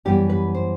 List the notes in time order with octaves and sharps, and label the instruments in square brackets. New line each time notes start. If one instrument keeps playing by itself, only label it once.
[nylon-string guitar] F#2 E3 G3 B3 G4
B4
C5